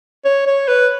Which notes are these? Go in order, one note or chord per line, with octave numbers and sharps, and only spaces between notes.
C#5
C#5
B4